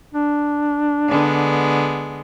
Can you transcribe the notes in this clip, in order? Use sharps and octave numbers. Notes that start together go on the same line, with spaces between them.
D4
D3 G#3 B3